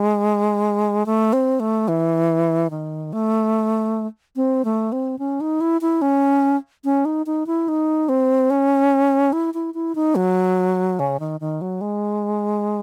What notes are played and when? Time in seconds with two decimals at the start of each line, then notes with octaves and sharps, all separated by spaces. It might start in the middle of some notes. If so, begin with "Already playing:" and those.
Already playing: G#3
1.06 A3
1.33 C4
1.60 A3
1.88 E3
2.70 D#3
3.13 A3
4.36 C4
4.65 A3
4.92 C4
5.19 C#4
5.41 D#4
5.61 E4
5.81 E4
6.02 C#4
6.84 C#4
7.05 D#4
7.26 D#4
7.47 E4
7.68 D#4
8.09 C4
8.50 C#4
9.33 E4
9.54 E4
9.74 E4
9.95 D#4
10.15 F#3
10.99 C#3
11.20 D#3
11.40 D#3
11.61 F#3
11.81 G#3